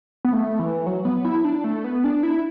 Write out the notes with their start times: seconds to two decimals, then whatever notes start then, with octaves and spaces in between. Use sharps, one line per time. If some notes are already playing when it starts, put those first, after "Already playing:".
0.25 B3
0.33 A3
0.59 E3
0.86 F#3
1.05 B3
1.25 E4
1.45 D4
1.64 A3
1.84 B3
2.04 D4
2.23 E4